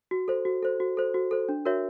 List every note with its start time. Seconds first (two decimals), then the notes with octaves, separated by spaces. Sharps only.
0.11 F#4
0.28 A4 C5
0.45 F#4
0.63 A4 C5
0.80 F#4
0.97 A4 C5
1.14 F#4
1.31 A4 C5
1.49 D4
1.65 F#4 A#4 C#5 E5